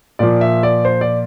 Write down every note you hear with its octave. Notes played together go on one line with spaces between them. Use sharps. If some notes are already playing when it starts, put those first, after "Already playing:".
A#2 F3 D5
E5
D5
C5
D5